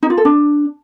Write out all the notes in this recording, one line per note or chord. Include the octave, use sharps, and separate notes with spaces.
D#4
F4
A4
D4